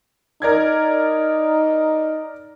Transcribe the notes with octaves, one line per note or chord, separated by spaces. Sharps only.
D#4 A#4 D5 G#6